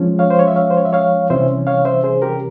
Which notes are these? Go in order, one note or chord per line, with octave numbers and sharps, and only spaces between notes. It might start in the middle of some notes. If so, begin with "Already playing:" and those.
Already playing: F3 G#3 C#4
C#5 F5
C5
C#5
E5
C#5 F5
C5
C#5
E5
C#5 F5
C3 E3 G3 C#4 C5 E5
C#5 F5
C5 E5
G#4 C5
G4 A#4